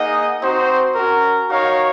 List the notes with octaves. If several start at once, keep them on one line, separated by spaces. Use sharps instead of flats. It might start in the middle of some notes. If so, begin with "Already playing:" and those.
Already playing: A#3 D#4 G#4 D#5 F#5
C4 D#4 F#4 C5
C#4 F#4 A#4
D#4 F#4 A#4 C#5 F5